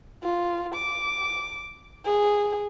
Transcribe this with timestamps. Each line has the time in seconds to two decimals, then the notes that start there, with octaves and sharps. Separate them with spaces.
0.23 F4
0.75 D6
2.05 G#4